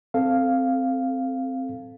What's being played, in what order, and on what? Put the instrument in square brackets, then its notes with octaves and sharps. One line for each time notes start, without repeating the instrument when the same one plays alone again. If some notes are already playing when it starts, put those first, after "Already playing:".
[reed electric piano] C4 A4 F5